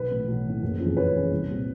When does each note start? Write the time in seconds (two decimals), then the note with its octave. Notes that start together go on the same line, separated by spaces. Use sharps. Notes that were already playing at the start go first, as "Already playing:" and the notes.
Already playing: B1 B4
0.11 A2 E3
0.28 B1
0.45 A2 E3
0.62 F#1
0.79 F2 C#3 E3 G#3
0.96 F#1 B4 C#5
1.13 F2 C#3 E3 G#3
1.31 C2
1.48 A#2 G3 C4